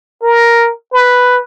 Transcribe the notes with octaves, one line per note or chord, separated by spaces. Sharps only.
A#4
B4